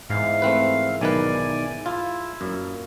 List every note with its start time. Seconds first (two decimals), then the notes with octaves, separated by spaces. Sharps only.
0.10 G#2 E3 B3 F5
0.42 A3 C4 E4 A#4 B4 F#5
1.01 B1 D#3 B4 D5 G#5
1.86 E4 F4 A5
2.41 F#2 A#2 D#4